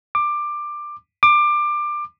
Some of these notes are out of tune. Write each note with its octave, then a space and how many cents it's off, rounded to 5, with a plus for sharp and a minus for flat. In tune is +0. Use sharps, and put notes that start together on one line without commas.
D6 +15
D6 +20